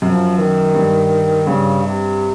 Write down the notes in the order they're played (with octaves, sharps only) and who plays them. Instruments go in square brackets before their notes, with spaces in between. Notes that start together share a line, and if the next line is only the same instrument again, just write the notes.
[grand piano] F#2 [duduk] F3
[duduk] D#3
[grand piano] G2
[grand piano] G2 [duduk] C#3
[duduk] C3